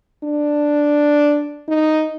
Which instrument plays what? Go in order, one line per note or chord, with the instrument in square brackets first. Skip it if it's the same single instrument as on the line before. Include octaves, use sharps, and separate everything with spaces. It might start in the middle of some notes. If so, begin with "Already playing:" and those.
[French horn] D4
D#4